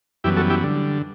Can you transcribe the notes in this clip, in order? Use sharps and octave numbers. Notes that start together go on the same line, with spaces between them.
F#2 E3 G3 B3 E4 G4
F#4 A4
E4 G4
D3 G3